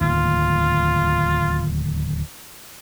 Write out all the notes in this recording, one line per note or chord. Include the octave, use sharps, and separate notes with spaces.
D1 D#2 F4